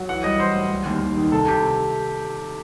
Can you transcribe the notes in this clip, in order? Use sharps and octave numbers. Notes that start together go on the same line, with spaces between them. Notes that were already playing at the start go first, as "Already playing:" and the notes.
Already playing: F#3
E3 F#5
G3 D#5
E3 C5
A2
G3
D#2
D#2
D#3
C3 A4
C3 G4